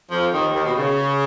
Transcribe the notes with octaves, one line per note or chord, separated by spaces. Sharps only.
F2 F3
D#2 D#3
D#2 D#3
B2
C#3